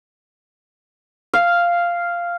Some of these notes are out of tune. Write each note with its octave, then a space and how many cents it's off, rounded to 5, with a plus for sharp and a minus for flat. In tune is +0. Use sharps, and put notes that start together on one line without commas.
F5 -5